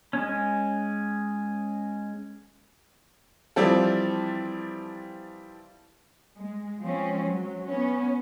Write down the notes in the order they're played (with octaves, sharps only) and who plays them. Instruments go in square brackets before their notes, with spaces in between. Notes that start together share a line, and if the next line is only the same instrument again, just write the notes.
[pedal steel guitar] G#3 C#4
[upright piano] E3 F3 G3 C4 A4
[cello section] G#3
F3 G#3 C4 C#4
F#3
B3 C#4